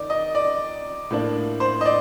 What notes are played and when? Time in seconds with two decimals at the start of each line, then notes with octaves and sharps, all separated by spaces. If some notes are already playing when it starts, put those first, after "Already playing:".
Already playing: D#3 D#4 D5
0.10 D#5
0.35 D5
1.11 A2 F3 A#3 D4
1.60 C5
1.81 D#5
1.85 D5